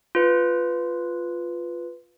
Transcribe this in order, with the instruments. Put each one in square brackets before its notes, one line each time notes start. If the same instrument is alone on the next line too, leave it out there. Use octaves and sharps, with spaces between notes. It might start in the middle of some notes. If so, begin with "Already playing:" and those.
[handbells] F4 B4